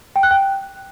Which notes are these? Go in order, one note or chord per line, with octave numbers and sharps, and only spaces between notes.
G5
F#6
G5